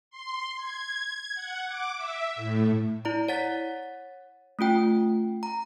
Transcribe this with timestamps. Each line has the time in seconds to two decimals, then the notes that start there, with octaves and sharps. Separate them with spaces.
0.10 C6
0.57 G#6
1.35 F#5
1.67 D6
1.96 E5
2.36 A2
3.05 E4 D5 A#5
3.28 C#5 F#5 A6 B6
4.59 A3 C#4 F4 G5
5.43 A#5